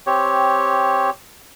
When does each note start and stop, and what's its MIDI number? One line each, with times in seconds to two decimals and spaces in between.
0.07 1.10 60
0.07 1.10 67
0.07 1.10 73